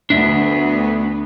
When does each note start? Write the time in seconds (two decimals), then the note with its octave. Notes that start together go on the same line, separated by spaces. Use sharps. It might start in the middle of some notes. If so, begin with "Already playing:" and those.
0.10 D2 B3 D4 E5